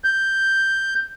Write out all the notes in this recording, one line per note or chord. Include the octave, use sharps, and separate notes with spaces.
G6